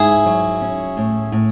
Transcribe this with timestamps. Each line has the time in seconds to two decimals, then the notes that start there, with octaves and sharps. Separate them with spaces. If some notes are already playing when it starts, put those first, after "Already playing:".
Already playing: G#2 E4 G#4
0.26 F#3
0.61 C#4
0.97 A2
1.32 A2